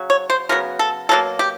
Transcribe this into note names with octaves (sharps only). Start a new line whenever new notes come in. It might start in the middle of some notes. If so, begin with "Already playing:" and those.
Already playing: C#3 F#3
C#5
C5
C#3 F#3 B3 A#4
A4
B2 F#3 A#3 A4
G4